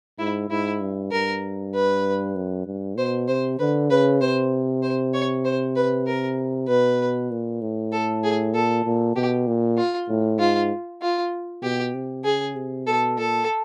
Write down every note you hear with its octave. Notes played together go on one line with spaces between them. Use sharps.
G#2 E4
G#2 E4
G2
G2 A#4
B4
F#2
G2
B2 C5
C3 C5
D3 B4
C#3 B4
C3 C5
C5
C#5
C5
B4
A#4
B2 B4
A#2
A2
A4
G#4
A#2 A4
A#2
B2 G4
A#2
F4
A2
G#2 F4
F4
B2 G4
C3
C#3 G#4
C3
B2 A4
A#2 A4